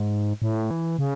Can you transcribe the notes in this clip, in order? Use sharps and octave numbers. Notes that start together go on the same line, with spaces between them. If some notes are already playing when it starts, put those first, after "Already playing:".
Already playing: G#2
A2
E3
C#3